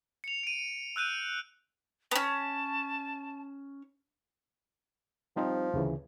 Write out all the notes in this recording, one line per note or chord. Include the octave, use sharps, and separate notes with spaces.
C#7 F7
D7 D#7
E6 F#6 G6 D#7
B3 C#4 A5
F3 G3 C4 D#4
D2 C#3 E3